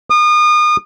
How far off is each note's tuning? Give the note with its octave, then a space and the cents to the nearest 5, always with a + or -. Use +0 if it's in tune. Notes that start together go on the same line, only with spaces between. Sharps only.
D#6 -35